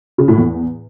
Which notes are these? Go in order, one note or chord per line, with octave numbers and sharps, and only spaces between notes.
C#3
A2
E2